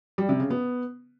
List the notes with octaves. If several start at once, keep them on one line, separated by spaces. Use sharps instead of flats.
G3
C3
C#3
B3